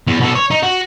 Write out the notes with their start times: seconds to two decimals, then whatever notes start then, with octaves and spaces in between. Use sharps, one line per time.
0.07 E2
0.20 B2 A4
0.35 C#5
0.51 D#4
0.63 F#4